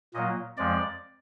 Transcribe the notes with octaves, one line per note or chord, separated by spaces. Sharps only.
A#2 F#3 A#3 D#5
F2 F3 G#3 D5